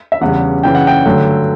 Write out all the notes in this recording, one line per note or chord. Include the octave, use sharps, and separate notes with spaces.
E5
E2 C#3 G3 F#5
F#2 C#3 E3 G5
F#5
G5
G2 D3 F#3 A3